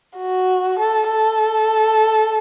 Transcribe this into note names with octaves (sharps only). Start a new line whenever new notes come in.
F#4
A4
A4